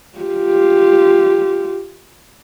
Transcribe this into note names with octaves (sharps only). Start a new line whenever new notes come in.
F4 G4